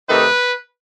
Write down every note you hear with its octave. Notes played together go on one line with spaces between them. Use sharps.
C3 D#3 A3 D#4 B4